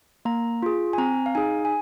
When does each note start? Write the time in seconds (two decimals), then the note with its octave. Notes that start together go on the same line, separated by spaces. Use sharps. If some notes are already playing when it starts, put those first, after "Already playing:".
0.25 A#3 A#5
0.63 F4 G#4
0.93 G#5
0.98 C4 A#5
1.26 F5
1.35 D#4 G#4 G#5
1.65 G#5